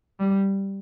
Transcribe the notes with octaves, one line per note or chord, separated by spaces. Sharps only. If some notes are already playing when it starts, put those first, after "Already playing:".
G3